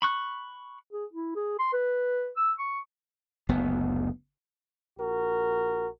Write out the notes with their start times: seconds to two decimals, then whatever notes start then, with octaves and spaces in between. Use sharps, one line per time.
0.02 B5 C#6 F#6
0.92 G#4
1.13 E4
1.36 G#4
1.59 C6
1.73 B4
2.37 E6
2.58 C#6
3.49 F#1 D2 B3
4.99 A#1 F#4 A#4